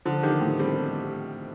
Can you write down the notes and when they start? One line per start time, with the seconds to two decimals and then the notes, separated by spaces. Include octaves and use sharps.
0.05 D3 F3
0.23 D#3 G4
0.41 A2
0.59 G3 C4